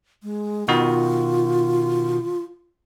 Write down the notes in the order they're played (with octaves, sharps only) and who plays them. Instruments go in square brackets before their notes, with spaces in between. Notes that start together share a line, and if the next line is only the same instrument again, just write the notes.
[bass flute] G#3
[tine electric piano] B2 D#3 F#4 [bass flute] F4